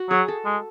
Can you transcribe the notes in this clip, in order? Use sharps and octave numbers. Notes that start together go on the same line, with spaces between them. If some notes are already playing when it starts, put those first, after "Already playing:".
Already playing: F#4
F#3 G#4
A4
G#3